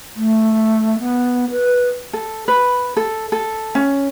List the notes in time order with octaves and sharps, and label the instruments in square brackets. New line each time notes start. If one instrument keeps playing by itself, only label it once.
[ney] A3
B3
B4
[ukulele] A4
B4
A4
A4
C#4